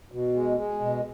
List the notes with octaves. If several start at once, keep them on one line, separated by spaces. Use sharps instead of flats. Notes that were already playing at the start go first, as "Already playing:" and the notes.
B2
G#3
G#3
B2